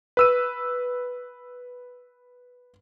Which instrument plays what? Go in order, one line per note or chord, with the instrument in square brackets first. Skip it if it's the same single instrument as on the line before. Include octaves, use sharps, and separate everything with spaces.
[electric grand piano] B4 E6 D#7